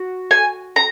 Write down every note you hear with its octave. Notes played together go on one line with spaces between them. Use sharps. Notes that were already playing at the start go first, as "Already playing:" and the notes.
Already playing: F#4
G#5
A#5